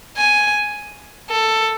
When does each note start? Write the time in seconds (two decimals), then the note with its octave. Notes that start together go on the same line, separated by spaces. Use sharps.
0.17 G#5
1.30 A4